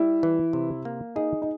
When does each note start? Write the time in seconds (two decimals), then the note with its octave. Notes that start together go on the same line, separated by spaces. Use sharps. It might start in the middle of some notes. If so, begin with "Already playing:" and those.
Already playing: G3 E4
0.23 E3
0.53 C3
0.85 A#3
1.16 D#4 G#4
1.42 D#4